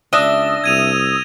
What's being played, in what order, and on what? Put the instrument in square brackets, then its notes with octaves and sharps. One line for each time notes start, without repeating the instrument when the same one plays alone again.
[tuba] C#2 [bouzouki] D4 E5 [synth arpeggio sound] D#6 E6 [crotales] A#6 G7
[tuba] C2 [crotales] G#6 D#7 F7